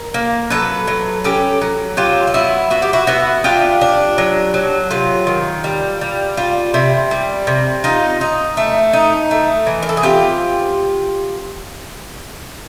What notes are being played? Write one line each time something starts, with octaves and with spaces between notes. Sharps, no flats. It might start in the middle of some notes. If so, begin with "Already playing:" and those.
Already playing: A#4
A#3
F#3 A4 B4
F#3
C#4 G4 A4
F#3
F#3 F4 G4
F4
B3 E4 F#4
B3 F#4
G4
E4 F#4
B3 E4 F#4
D4 F4 G4
D4
F#3
F#3
C3 F4
D#3
G3
G3
G3 F4
C3 E4
G3
C3
D#4 F4
D#4
A3
D#4
A3
E3
A#4
A4
G#4
C4 F4 G4